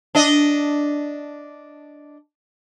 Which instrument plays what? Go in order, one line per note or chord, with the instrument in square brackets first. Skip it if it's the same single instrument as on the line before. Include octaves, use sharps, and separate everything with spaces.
[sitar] D4 D#5